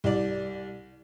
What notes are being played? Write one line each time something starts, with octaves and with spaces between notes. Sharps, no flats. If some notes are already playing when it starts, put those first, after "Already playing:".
C2 D5